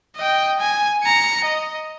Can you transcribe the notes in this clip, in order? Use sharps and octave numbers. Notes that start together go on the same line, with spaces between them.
D#5 G5
G#5
A#5 C#7
D#5